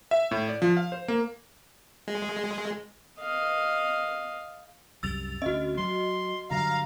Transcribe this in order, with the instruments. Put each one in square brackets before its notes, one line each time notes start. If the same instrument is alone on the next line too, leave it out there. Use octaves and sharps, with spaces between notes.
[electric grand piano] E5
A2
D5
F3
F5
C5
A#3
[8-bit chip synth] G#3
[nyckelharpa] D#5 F5
[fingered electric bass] C2 F#2 G3 [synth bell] E6 A6 F7
[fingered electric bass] D2 C#4 [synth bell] F#4 D#5
[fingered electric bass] F#3 [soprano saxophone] C6
[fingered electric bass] G2 D3 F#3 [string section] F5 [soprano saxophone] A#5